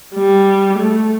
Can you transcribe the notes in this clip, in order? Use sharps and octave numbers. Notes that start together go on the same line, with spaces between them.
G3
A3